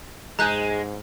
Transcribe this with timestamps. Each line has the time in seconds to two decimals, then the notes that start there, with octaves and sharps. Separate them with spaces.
0.39 G#2 G#3 G#4 A#5 F#6 G6